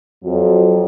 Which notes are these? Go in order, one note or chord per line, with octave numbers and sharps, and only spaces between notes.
F2 F#3